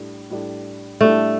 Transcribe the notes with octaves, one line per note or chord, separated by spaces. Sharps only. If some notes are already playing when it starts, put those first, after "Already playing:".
Already playing: A2 G3 D4
A2 G3 D4
A2 G3 A3 D4